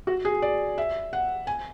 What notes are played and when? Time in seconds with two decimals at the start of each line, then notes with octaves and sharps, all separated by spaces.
0.07 F#4
0.25 G#4
0.42 D5
0.78 E5
1.13 F#5
1.47 G#5